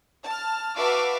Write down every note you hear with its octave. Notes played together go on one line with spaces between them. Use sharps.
A5 F6
F#4 B4 E5 F5 A5 D6